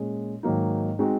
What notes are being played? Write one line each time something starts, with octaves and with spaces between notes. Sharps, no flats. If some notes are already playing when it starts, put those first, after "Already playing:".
Already playing: A#2 G#3 C#4
G#2 D#3 F#3 A#3 D#4
G#3 C4 D#4 F#4